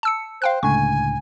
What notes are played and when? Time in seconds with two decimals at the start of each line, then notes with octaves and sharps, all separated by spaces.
0.03 A5 E6 C#7
0.42 C5 F5 G5 F#6
0.63 C#2 A2 D3 G#5 C#6